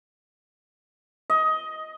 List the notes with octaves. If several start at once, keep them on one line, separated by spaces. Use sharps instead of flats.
D#5